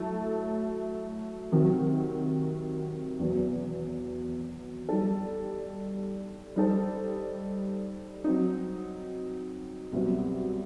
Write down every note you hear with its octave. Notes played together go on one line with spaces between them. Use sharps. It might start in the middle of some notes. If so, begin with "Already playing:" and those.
Already playing: F#3 A3 E4 A4
C3 D#3 F#3 C4 F#4
E2 B2 F#3
G3 D#4 A4
G3 D#4 A4 C5
F#3 C4 D#4
C2 B2 F#3 C4 F#4